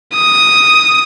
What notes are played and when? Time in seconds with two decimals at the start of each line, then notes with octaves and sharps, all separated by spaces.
0.14 D#6